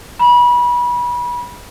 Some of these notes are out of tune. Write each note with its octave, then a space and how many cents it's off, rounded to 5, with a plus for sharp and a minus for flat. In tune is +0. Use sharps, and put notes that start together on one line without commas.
B5 -30